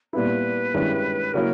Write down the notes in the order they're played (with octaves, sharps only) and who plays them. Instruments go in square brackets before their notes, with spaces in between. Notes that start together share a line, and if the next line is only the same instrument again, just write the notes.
[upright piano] A#2 G3 B3 E4 [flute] B4
[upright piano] G2 D#3 G#3 C#4 E4
[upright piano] C#3 F#3 A#3 C#4 E4 [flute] A#4